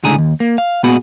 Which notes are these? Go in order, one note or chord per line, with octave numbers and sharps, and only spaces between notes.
C#2 A2 D3 G#4 G#5 A#5
D#2
A#3
F5
A#2 B3 F#4 G#4 B5